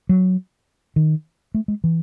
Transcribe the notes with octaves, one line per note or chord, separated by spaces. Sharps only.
F#3
D#3
A3
G#3
E3